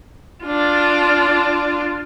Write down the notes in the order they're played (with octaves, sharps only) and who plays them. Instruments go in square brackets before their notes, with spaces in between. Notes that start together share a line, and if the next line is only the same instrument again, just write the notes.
[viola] D4 F4